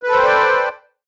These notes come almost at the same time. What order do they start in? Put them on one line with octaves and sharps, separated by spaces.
B4 A4 C5 G5 D5